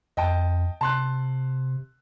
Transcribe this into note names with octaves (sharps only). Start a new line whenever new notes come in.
F2 D#5 G5 A5
C3 A5 C6 F#6